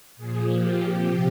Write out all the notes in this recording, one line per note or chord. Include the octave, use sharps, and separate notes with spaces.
A#2 F3 G#4
G4
C3 F3